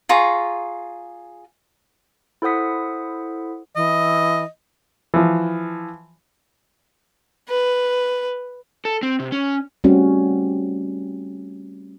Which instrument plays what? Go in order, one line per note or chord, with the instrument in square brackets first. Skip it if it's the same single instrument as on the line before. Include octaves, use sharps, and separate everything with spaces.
[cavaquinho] F4 G#4 A#5 C#6
[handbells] E4 A4 C5 F#5 D#6 B6
[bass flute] E3 [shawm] D#5
[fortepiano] E3 F3
[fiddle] B4
[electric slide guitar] A4
C4
C3
C#4
[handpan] G3 A3 C4 C#4 F#4